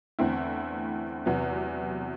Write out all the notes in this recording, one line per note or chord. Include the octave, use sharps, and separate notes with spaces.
E2 D3 A3 C4 E4
E2 C3 F#3 B3